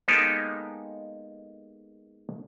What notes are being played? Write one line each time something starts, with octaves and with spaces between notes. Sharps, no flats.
G#3 A#3 B3 D#4 G4 A4